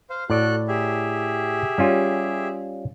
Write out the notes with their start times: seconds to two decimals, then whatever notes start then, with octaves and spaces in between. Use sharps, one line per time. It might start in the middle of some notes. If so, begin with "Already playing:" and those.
0.10 C5 F5
0.30 A2 F#4 A4 D5 F#6
0.68 G4 G#4 E5
1.78 G3 C#4 F4